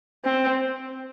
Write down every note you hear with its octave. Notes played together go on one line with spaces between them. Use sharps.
C4